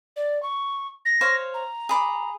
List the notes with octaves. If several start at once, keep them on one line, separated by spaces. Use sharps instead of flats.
D5
C#6
A#6
C5 C#5 F5
A#5
G#4 B5 D6